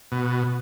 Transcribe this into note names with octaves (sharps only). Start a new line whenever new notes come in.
B2